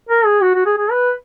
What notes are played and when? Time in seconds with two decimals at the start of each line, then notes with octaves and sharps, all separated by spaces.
0.09 A#4
0.26 G#4
0.41 F#4
0.55 F#4
0.66 G#4
0.78 G#4
0.91 B4